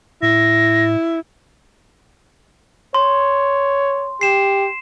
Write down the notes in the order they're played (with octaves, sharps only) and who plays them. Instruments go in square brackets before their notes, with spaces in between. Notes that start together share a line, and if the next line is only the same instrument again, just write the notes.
[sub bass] A2 [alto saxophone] E4 [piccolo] A#6
[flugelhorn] C#5 [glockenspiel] C6
[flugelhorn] G4 [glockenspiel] C7 E7